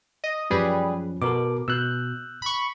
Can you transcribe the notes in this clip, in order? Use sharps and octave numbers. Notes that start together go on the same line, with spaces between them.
D#5
F#2 F3 G3 C#4 G#4 B4
B2 A4 A#4 D6
B2 E6 F#6 G6
B5 C#6